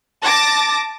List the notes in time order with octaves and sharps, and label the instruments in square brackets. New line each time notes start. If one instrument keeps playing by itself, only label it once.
[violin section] A5 D6 A6 A#6